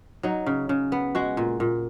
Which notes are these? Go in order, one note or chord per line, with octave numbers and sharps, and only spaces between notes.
F#3 D#4
C#3
C#3
B3
G#3 F#4
A#2
A#2